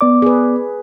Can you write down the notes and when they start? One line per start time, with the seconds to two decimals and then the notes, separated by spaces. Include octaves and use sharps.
0.01 B3 D5 D6
0.22 G#4 B4